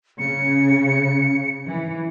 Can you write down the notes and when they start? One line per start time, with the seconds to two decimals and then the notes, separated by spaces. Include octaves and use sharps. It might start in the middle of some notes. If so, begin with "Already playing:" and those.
0.19 C#3 C#7
1.66 E3